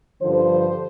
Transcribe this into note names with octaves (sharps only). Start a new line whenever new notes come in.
G2 D3 F3 C5